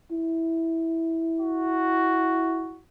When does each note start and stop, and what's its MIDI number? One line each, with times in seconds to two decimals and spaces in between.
0.12 2.79 64
1.41 2.83 66